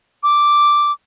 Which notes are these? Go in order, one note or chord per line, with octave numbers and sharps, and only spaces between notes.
D6